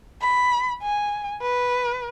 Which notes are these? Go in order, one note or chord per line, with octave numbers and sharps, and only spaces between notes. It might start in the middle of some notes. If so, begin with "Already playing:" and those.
B5
G#5
B4